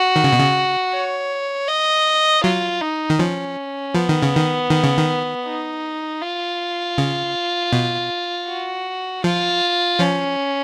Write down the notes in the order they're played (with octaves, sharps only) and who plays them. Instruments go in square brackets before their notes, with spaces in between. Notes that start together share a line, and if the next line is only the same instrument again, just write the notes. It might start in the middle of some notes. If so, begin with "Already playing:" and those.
Already playing: [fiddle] F#4
[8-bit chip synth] D#3
C#3
B2
C#3
[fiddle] C#5
D#5
[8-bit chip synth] F#3 [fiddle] F4
[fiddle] D#4
[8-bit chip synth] D#3
[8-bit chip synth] F3 [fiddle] C#4
[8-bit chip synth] F3 [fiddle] B3
[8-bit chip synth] D#3
C#3
D#3
D#3
C#3
D#3
[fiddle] D#4
F4
[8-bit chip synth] C#3
B2
[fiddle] F#4
[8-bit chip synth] F3 [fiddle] F4
[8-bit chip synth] F3 [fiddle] C#4